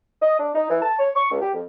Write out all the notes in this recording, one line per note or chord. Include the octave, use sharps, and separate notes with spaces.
D#5
D4
D#4
E3
A5
C#5
C#6
C#2
G4
F2